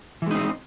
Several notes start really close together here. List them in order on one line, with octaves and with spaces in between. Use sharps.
E3 G#3 D#4 C4